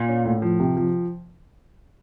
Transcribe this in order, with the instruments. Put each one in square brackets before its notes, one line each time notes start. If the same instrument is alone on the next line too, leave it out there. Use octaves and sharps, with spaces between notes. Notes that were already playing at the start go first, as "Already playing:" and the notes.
Already playing: [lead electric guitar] A#2
[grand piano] C#4
A2
F3
C3
F3